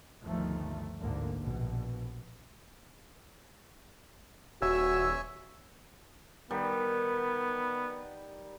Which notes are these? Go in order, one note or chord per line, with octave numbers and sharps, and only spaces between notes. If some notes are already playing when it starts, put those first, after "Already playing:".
G1 D2 D#3 F3 A3
A1 D2 G#2 D3 A#3
A#1 B2
D#1 F#4 C#5 E5 G#5 E6
D#3 G3 B3